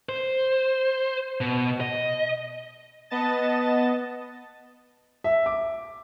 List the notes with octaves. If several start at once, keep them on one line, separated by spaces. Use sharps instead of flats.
C5
B2
D#5
B3 D#5 A5 A6
E5
D6